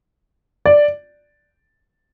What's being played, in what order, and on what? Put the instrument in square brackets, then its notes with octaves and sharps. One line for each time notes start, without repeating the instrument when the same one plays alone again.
[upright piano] D5